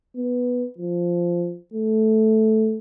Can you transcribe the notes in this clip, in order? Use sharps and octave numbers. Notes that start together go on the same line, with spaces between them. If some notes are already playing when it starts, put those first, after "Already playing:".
B3
F3
A3